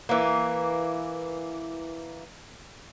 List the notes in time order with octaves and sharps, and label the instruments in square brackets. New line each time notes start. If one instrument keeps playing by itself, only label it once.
[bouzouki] E3 A#3